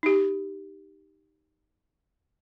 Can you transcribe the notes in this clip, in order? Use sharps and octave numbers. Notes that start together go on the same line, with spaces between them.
D#4 G4